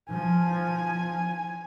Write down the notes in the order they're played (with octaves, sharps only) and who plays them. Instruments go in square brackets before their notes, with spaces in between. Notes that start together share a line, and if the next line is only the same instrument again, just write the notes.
[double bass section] F3 [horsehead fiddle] G#5